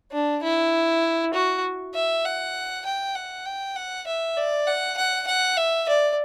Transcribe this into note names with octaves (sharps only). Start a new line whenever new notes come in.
D4
E4
F#4
E5
F#5
G5
F#5
G5
F#5
E5
D5
F#5
F#5
F#5
E5
D5